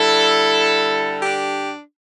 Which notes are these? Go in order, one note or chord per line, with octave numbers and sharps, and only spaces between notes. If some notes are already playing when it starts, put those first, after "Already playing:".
Already playing: D3 G3 E4 A4
D4 G4